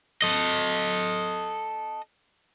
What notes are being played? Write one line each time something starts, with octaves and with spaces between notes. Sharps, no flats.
A4 D#5